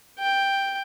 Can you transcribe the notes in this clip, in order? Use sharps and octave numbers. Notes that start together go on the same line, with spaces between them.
G5